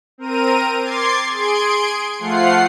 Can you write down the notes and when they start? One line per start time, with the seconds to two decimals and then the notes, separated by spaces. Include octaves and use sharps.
0.18 C4 A#4 A#5 D#7
0.80 C6 D6 G#6 A6 C7
1.30 G#4 C6 G#6 D7
2.19 F3 A3 F4 F#5 C7